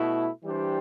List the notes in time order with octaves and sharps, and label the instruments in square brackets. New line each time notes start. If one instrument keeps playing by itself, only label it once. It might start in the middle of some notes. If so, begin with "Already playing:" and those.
Already playing: [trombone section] B2 A3 E4
E3 G3 D4 G4 C5